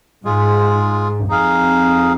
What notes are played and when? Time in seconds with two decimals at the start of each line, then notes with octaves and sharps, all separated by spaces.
0.24 G#2 G#3 F4 G#4
1.29 F2 D#4 G#4 F5